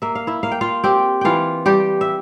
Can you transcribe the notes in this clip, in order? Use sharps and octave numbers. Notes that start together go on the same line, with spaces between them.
A#3 E5
F5
E4 E5
A#3 F5
G5
F4 F5
C4 G4 G5
E3 F4 F5 G5
G3 G4 G5
E5